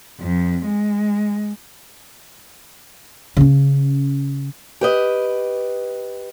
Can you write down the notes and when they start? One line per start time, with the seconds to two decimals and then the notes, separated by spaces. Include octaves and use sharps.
0.20 F2
0.65 G#3
3.37 C#3 C#4
4.81 G4 B4 D#5